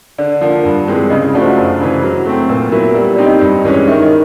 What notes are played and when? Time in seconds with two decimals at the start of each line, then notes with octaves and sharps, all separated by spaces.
0.18 D3 D5
0.41 F3 A#3
0.65 G2
0.87 E3 G#3 C4
1.10 C#3 D#5
1.34 F3 A3 D4 F#4
1.42 C5
1.57 F#2
1.81 C#3 E3
2.03 F#3
2.26 A3 C4
2.49 A#2 B4
2.72 F#3 B3 E4 A#4
2.95 G3 B4
3.16 C4 D#4 G4 D5
3.26 D#5
3.41 G2
3.65 E3 G#3 C#4
3.88 D#3 E5
4.03 D#5